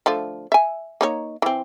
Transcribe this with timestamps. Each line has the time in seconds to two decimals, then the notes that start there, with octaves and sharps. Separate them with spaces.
0.06 D3 F3 A3
0.52 E5 G#5
1.01 A#3 D#4 C#5
1.42 E3 C4